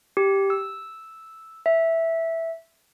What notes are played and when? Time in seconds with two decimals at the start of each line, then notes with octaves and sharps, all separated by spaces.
0.17 G4
0.50 E6
1.66 E5